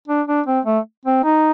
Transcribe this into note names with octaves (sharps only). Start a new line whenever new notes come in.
D4
D4
C4
A3
C4
D#4